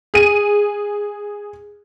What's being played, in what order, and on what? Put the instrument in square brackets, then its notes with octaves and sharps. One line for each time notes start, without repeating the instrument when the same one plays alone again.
[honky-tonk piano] G#4 D#7